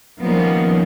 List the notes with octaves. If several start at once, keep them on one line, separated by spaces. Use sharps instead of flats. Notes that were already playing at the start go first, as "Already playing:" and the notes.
D#3 F3 G3 A#3 B3 C#4